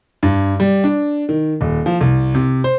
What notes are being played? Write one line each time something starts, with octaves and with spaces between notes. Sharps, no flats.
G2
G3
D4
D#3
D#1
F3
C2
C3
C5